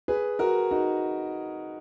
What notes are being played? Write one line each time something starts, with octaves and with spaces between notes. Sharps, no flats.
G#4 B4
F#4 A#4
D#4 F#4